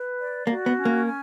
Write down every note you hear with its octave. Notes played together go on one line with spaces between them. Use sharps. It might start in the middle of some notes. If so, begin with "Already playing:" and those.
Already playing: B4
D5
A#3 F#4
B3
C#4
A#3
G#5